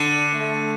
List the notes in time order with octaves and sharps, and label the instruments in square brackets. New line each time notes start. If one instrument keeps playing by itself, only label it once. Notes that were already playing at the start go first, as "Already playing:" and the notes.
Already playing: [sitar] D3 [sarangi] D4
[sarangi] A3